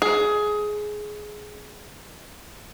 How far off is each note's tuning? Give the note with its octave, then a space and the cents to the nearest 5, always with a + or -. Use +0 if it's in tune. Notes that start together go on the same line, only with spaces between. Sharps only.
G#4 +15